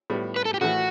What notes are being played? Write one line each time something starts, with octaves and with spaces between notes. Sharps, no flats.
A2 G3 B3
B4
A4
G4
A2 E3 A3 F#4